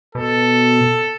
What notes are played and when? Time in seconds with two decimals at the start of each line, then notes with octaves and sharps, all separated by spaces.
0.15 B2 A4